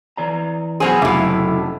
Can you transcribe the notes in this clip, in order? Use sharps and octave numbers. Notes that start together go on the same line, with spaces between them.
E3 D5 A#5
B2 F#3 G#4 C5 C6
F1 F2 A2 C#3 F#3 E5 D6